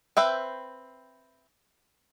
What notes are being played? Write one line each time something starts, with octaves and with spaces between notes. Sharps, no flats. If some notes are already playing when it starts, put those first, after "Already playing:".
C4 B4 E5 G5